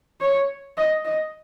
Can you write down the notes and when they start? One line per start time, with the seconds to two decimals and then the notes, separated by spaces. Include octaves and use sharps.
0.21 C#5
0.77 D#5
1.05 D#5